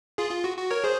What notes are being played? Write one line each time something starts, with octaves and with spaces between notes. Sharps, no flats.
F4 G#4
F4
F#4
F#4
A#4 C#5
G#4 C5